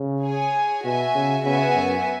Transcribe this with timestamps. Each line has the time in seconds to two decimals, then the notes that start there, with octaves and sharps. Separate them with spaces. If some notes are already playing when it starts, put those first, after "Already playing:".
Already playing: C#3
0.24 G#4 C#5 G#5
0.85 B2 F#4 E5 G#5
1.15 C#3
1.45 C#3 B3 F#4 E5 G#5
1.75 F#2